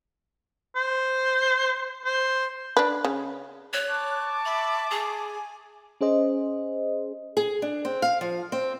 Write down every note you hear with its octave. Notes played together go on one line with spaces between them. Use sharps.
C5
C5
D4 B4
C#3
C#5 F#6
A5 C#6 D6
E5 B5
G#4 G#5
C#4 G#4 C5 D#5
G#4
D4
C4
F5
F3
C4